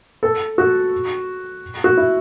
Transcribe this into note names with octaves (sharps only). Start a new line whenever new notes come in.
A4
F#4
F#4
E4